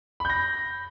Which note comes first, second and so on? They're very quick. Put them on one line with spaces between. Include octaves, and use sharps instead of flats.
B5 G6 A#6